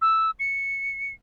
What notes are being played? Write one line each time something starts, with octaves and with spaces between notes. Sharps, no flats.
E6
C#7